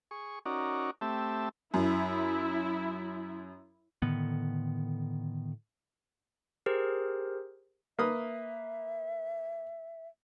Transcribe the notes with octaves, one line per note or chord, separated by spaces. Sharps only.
G#4 C#6
C#4 D#4 F#4 A#4 D5
A3 C4 G4 E5 A5
F#2 E4
A2 D3 D#3 B3
G4 G#4 A#4 C5
A#3 B4 E5 D#6